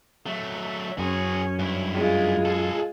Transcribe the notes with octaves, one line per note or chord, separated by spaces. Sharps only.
F#3 A3 E5
F#2 C#4 F#4 G#4
G2 E4
G#3 F4
G#4 A4